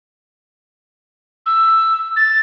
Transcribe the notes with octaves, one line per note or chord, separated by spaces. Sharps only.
E6
A6